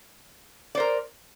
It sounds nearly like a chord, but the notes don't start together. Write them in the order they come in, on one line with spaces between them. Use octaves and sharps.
D5 C5 A#4